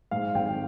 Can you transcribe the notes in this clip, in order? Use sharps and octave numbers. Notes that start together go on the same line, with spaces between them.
G#2 F5
G#1 G5